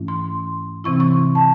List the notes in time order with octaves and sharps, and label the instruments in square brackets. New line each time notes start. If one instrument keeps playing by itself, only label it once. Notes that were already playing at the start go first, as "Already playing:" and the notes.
Already playing: [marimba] G#2 E3 A3 C#4 E4
C6
C3 E3 C4 E4 C#6
C#6
A5